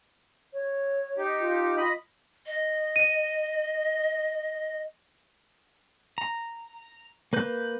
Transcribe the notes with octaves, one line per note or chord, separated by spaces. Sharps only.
C#5
D#4 G4
F4
D#5 B5
D#5
D#7
A#5
A#3 B4 G6